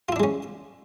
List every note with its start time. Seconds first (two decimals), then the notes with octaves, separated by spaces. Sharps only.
0.09 F4
0.12 E4
0.16 D4
0.20 G#3
0.23 C#4